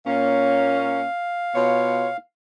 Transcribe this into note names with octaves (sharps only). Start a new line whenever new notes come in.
A#2 A#3 C#4 F5
B2 F4 C#5